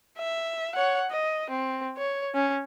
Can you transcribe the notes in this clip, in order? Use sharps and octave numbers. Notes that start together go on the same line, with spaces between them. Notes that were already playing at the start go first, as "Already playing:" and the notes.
E5
C#5 F#5
D#5
C4
C#5
C#4